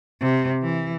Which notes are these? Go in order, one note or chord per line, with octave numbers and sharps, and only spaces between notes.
C3
E3